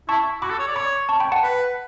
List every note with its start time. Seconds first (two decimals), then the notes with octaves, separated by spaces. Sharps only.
0.09 E4 A5 C#6
0.42 F#4 B5 D6
0.50 A4
0.59 C#5
0.68 D5
0.76 C#5 B5 D6
1.09 A5 C#6
1.20 G5 B5
1.32 F#5 A5
1.43 B4